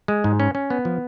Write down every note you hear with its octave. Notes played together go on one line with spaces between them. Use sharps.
G#3
G#2
C#4
C#4
B3
F3